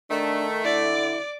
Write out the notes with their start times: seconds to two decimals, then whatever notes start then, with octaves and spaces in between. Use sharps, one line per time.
0.11 D#3 A3 D4
0.64 D3 E4 D5 D6